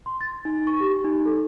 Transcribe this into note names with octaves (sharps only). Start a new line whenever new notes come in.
C6
A6
D#4
C#6
G4
D#4
A4